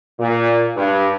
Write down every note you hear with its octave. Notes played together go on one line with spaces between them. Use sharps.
A#2
G2